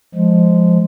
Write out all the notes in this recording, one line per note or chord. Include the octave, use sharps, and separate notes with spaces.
F3 G#3